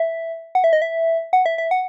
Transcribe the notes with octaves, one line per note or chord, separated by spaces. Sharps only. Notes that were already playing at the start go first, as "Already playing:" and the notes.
Already playing: E5
F#5
E5
D#5
E5
F#5
E5
E5
F#5